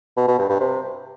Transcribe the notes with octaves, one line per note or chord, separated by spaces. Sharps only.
B2
B2
G2
G2
C3